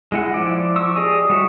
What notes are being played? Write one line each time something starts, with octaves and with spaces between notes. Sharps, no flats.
G#3 E4 F#5
F3 E4 D5
C#6 E6
G4 G#4 D5 D#5 G#5
G3 F#4 C#5 E5